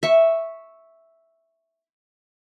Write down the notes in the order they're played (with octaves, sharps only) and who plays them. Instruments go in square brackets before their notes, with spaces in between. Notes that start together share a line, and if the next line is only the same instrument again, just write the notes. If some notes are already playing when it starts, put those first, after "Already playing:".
[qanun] E5 C#6